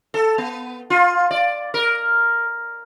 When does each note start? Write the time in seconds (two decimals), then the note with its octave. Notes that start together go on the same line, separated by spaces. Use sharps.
0.14 A4
0.38 B3
0.90 F4
1.31 D5
1.74 A#4